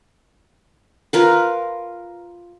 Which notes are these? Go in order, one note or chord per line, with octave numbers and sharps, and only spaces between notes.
F4 A#4 B4